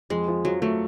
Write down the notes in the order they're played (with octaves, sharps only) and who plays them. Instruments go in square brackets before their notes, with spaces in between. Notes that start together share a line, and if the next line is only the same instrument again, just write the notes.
[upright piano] F2 [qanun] G#3
[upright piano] F3
[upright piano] F3 [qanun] F#3
[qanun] F#3 [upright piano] A3